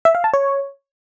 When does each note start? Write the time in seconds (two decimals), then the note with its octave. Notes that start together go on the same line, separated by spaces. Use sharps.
0.05 E5
0.15 F5
0.24 A5
0.34 C#5